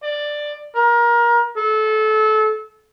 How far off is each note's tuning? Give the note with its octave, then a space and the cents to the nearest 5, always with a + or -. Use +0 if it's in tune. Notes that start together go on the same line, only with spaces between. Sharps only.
D5 +10
A#4 +25
A4 -25